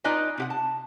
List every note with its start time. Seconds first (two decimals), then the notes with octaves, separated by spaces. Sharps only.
0.04 D#4 F4 B4 D5 D#5 G#5
0.38 C3 G4 F#5
0.50 A5